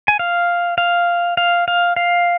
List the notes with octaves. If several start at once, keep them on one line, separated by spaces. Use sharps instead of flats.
G#5
F5
F5
F5
F5
F5